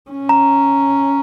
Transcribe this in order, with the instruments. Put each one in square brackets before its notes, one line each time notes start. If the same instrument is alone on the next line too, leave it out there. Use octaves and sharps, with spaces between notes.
[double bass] C#4
[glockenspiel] A#5